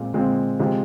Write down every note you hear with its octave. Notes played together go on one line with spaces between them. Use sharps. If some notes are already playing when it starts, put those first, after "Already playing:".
Already playing: A#2 G#3 C4 F4
A#2 G#3 C4 F4
C3 F3 G#3